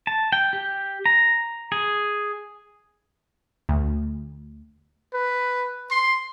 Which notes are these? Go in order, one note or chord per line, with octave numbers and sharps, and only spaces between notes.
A5
G5
G4
A#5
G#4
D2
B4
C6